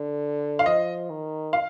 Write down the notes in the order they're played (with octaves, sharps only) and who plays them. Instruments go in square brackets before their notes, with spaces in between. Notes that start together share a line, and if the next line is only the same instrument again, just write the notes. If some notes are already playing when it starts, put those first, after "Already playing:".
Already playing: [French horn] D3
[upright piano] F5
[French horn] F3 [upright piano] D#5
[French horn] D#3
[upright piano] F5